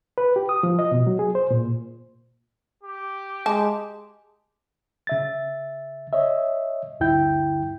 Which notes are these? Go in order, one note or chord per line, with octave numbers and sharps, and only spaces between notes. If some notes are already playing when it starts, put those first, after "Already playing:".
B4
G4
D#6
F3
D#5
B2
F#3
G#4
C5
A#2
G4
G#3 A5
C#3 E5 A6
C#5 D#5 E5
D2 G2 D3 E4 G5 G6